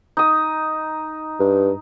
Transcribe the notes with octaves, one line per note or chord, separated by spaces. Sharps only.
D#4 D#6
G2